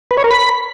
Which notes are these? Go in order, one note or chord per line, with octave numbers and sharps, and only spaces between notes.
B4
C#5
A#4
B5